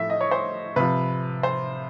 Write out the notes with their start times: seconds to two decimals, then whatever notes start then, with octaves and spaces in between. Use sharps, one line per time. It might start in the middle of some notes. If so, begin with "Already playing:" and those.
Already playing: A2 F3 E5
0.10 D#5
0.21 C#5
0.31 C5
0.76 C3 F3 B4
1.43 C5